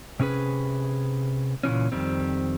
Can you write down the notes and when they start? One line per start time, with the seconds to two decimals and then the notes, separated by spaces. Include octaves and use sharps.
0.20 C3 C#4 G#4 B4
1.63 A#2 C#3 E3 C#4
1.92 F2 D#3 G3 C4